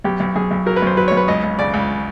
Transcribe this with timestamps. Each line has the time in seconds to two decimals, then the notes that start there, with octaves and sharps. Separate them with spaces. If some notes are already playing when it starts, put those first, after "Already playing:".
0.04 B1 G4
0.20 B1
0.36 B1 G#4
0.51 B1
0.66 F#3 A#4
0.76 B4
0.82 B1 C5
0.97 F#3 B4
1.08 C#5
1.12 B1
1.17 B4
1.28 C#2 D#5
1.43 C#2
1.59 C#3 D5
1.74 C#2